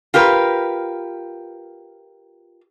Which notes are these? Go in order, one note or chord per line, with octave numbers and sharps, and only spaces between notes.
F4 G4 A#4 B4